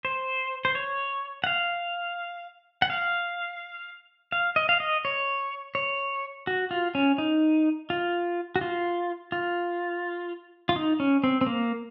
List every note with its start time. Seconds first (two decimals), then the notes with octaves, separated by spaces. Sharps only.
0.05 C5
0.65 C5
0.75 C#5
1.44 F#5
1.46 F5
2.82 F#5
2.90 F5
4.32 F5
4.56 D#5
4.69 F5
4.80 D#5
5.05 C#5
5.75 C#5
6.47 F#4
6.71 F4
6.95 C#4
7.18 D#4
7.90 F4
8.56 F#4
8.61 F4
9.32 F4
10.69 F4
10.76 D#4
11.00 C#4
11.24 C4
11.41 C4
11.46 A#3